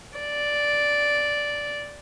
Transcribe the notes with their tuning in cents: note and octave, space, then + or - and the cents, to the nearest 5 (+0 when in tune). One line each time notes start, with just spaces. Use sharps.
D5 -5